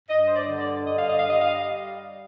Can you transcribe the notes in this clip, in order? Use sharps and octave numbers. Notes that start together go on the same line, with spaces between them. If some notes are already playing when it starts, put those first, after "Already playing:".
G2 D#5
C5
D5
D3
D5
G2 D#5
F5
D#5
F5
G3 D#5
F5
D#5